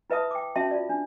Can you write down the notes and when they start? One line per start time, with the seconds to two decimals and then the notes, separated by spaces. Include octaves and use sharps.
0.10 E4 B4 E5 A5 D#6
0.31 G5 D6
0.55 C#4 F#4 E5 A5 C6
0.71 F4 D5
0.89 D4